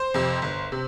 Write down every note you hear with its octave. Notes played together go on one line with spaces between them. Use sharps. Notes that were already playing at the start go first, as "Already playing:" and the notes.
Already playing: C5
F2 C3
G1
C3